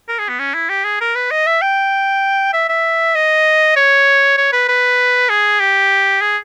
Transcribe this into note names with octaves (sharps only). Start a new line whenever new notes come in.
A#4
G#4
B3
C#4
E4
G4
G#4
A#4
B4
D#5
E5
G5
E5
E5
D#5
C#5
C#5
B4
B4
G#4
G4
G#4